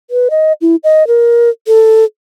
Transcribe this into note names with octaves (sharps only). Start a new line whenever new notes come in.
B4
D#5
E4
D#5
A#4
A4